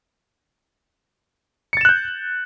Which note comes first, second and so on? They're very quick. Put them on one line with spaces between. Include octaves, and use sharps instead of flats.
C#7 A6 E7 F#6 G6